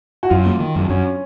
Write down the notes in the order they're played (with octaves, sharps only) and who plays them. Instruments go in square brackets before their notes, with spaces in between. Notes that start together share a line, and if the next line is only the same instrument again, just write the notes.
[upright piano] F#4
[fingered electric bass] F#2 [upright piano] F4
[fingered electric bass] A#3
D#3
F#2
[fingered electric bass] F#2 [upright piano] C#4